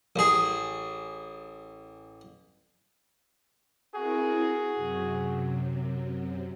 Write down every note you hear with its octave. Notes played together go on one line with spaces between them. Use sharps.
A1 G#4
C4 E4 F#4 G#4 A#4
F#2 C3 F#3